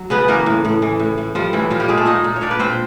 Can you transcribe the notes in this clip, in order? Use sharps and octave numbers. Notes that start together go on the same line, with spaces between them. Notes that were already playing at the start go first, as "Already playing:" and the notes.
Already playing: F#3
C#3 B3 B4
E3 A#3 A#4
A2
A2
E3
A2
A2
F3 G3 F4
A2 E3 E4
A#2 F3 F4
G3 G4
A#2 G#3 G#4
A3 A4
A#2 D#4 D#5
A#2
C#5
A#2 D4 D5
B4
A#2 C4 C5